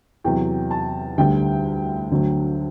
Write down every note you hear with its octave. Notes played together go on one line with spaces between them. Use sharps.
E2 C3 F#3 G5
A5
D2 D3 G3 G5
D2 D3 F#3